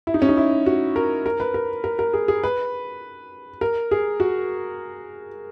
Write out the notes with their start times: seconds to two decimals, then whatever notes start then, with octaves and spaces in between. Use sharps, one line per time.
0.07 E4
0.14 D#4
0.22 C#4
0.29 D#4
0.37 E4
0.66 F#4
0.96 A#4
1.26 A#4
1.40 B4
1.54 A#4
1.84 A#4
1.99 A#4
2.13 G#4
2.28 G#4
2.43 B4
3.61 A#4
3.91 G#4
4.20 F#4